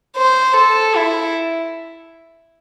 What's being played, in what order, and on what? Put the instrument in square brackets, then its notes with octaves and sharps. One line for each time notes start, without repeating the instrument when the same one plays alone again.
[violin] C5
A4
E4